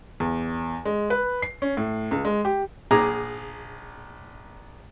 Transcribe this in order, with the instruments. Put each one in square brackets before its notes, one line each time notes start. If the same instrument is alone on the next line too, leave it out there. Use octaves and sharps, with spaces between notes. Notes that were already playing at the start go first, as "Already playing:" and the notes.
[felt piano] E2
G#3
B4
C7
C#4
A2
C#2
G#3
G4
[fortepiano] A#1 G#4 A#5 D6